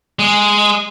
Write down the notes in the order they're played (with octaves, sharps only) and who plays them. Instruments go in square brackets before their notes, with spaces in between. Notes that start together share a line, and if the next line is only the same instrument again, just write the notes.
[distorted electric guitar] G#3